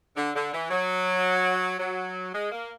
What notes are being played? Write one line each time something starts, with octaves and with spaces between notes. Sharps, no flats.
D3
D3
E3
F#3
F#3
G#3
A#3